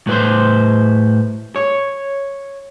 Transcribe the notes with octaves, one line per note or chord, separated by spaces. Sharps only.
A2 B4 C5
C#5